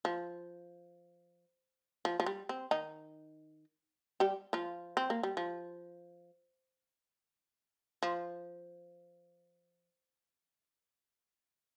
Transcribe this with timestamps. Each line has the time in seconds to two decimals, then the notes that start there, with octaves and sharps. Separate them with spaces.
0.05 F3
2.05 F3
2.20 F3
2.26 G3
2.49 C4
2.71 D#3 D#4
4.20 G3 G4
4.53 F3 F4
4.97 C4
5.10 A#3
5.23 G3
5.37 F3
8.03 F3